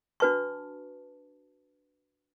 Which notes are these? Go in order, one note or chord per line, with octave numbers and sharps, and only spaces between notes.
D4 F#4 B4 A5 C#6